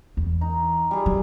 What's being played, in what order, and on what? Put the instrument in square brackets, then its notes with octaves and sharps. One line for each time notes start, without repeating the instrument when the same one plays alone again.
[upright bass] E2
[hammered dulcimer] D#4
G3 G#4
[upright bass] F#3